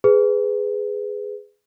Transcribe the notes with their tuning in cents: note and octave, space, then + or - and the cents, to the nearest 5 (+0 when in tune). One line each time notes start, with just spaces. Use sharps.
G#4 +0 B4 +15